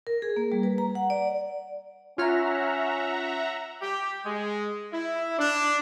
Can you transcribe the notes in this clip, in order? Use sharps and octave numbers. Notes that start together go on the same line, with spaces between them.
A#4
G#4
A#3
G3
B4
A#5
F#5
D5
C#4 F4 C#5 E5 F#5 A#5 F6
G4
G#3
E4
D4